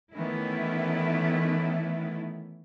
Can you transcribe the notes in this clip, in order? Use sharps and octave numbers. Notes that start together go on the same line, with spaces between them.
D#3 E3 A3 B3 C#4 E4